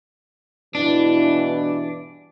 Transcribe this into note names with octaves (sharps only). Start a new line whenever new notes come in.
G2 B2 E3 D4